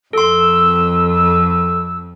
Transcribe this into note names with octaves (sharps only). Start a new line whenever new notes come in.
F2 A4 C6 E6